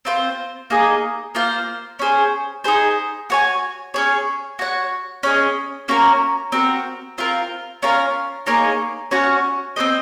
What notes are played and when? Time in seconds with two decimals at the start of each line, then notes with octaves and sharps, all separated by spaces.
0.05 C4 F4 C5
0.70 A#3 D#4 G#4 D#5
1.35 A#3 F4 C5 F5
1.99 C#4 G#4 C5
2.64 D#4 G#4 C5
3.30 F#4 C#5 G#5
3.94 C#4 G#4 C#5
4.59 F#4 C#5 F#5
5.23 C#4 G#4 D#5
5.88 A#3 C#4 F#4 A#4
6.52 C4 F#4 A#4
7.18 C4 F4 A#4
7.83 C#4 F4 A#4 F5
8.46 A#3 D#4 G#4 C#5
9.11 C#4 F#4 C#5 F#5
9.76 C4 F#4 C5 D#5